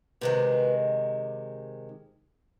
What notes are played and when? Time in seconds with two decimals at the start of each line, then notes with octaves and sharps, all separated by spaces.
0.21 C3 D#3 G#3 B4